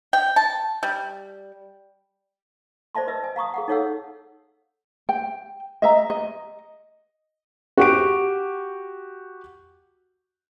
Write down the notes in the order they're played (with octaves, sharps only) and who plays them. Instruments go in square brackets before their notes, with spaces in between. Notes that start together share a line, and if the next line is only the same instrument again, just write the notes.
[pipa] G5
A5
G3
[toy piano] C5 D5 E5 A5 C6
B4 D#5 E5 E6
G#5
F5 A#5 C#6 D#6
G#4 F5 F#5
D#4 A4 C#5 F5 F#5 E6
[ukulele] G5
D#5 E5 A#5
D#5
[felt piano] F#4 G4 D7